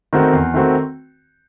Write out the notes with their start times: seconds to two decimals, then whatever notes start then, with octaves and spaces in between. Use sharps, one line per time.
0.13 D#3 A3 C4 F#4
0.33 E2
0.54 D#3 A3 C4 F#4